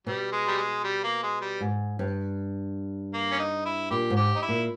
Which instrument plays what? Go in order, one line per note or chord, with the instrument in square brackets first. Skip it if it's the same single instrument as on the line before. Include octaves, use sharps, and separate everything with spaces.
[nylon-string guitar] B2 [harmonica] G3
[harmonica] G#3
G3
G#3
G3
A#3
G#3
G3
[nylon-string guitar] G#2
G2
[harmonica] A#3
C#4
D#4
E4
[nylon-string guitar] A#2 [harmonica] G4
[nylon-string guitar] G#2
[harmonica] G4
D#4
E4
[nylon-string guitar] A#2